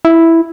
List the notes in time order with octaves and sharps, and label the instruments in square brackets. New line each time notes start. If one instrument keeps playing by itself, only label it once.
[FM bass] E4